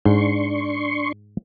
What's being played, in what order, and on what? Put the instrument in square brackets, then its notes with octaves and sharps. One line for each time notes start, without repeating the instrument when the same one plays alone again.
[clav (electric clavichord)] G#2 [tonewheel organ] D4 C6 C#6